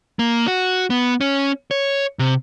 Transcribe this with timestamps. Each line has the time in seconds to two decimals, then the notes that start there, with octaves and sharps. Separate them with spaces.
0.19 A#3
0.47 F#4
0.90 B3
1.21 C#4
1.71 C#5
2.19 C3